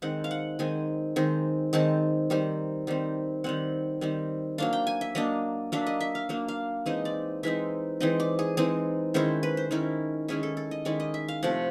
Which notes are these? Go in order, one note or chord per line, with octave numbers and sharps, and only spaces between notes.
D#3 G#3 C4 F#5
F5
F#5
D#3 G#3 C4 G#5
D#3 G#3 C4
D#3 G#3 C4 A5
D#3 G3 C4
D#3 G3 C4
D#3 G3 C4 F#5
D#3 G3 C4
F#3 A#3 D4 F5
G5
G#5
E5
F#3 A#3 D4 D#5
F#3 A#3 D4 E5
D#5
E5
F5
F#3 A#3 D4
F5
E3 G#3 C4 D#4 D#5
D5
E3 G#3 C4 D#4 E5
E3 G#3 C4 D#4 D#5
D5
G#4
E3 G#3 C4 D#4 G#4
D#3 G#3 C#4 E4 C5
B4
C5
D#3 G#3 C#4 E4 A#4
D#3 G#3 C#4 E4 G#4
A4
A4
D#5
D#3 G#3 C#4 E4 D5
D#5
E5
F5
C3 F3 A3 F#5